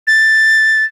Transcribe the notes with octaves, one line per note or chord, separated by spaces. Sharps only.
A6